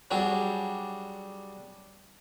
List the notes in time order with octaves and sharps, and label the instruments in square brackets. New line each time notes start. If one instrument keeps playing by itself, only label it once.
[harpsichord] F#3 G3 D4 F#4 G#4